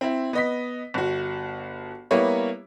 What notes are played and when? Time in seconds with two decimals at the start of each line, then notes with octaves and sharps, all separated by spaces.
0.01 C4 E4
0.33 B3 D#5 B6
0.94 G1 F#4
2.11 G3 A#3 B3 E4 C#5